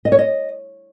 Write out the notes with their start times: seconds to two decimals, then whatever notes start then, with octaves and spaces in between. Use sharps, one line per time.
0.05 D#5
0.12 C#5
0.19 D#5